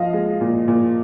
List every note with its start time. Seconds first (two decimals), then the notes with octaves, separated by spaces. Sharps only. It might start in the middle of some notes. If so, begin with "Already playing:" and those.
Already playing: F3 D#5 F5
0.13 G#3
0.41 A#2
0.68 A#2